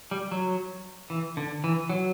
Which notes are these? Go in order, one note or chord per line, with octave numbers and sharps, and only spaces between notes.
G3
F#3
E3
D3
E3
F#3